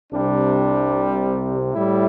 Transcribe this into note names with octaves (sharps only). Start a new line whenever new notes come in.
C2 C3 G3 D4
A2 G3 E4